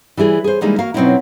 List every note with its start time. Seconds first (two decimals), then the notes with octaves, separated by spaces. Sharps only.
0.17 E3 G3 E4 G#4
0.44 G#4 C5
0.61 E3 G3 G#3 A#3 D#4
0.79 A#3 F#4 F5
0.94 B2 F#3 C4 C#4 D#4 E4